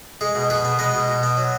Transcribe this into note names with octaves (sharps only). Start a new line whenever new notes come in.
G#3 G#4
B2
B2 G#4 B4
B3
G#3 B4 D#5
B2
B2
B3
F#3